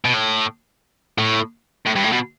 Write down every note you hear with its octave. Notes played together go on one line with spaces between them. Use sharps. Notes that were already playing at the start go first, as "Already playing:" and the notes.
B2
A2
A2
A2
G2
A2
B2